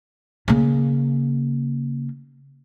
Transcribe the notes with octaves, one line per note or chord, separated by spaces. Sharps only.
C#3 A#3